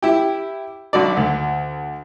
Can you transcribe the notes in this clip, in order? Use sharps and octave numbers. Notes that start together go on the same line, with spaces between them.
E4 G4
B1 D4 F#4 D5
D2